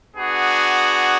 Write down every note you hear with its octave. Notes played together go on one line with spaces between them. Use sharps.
B3 D4 F#4 G#4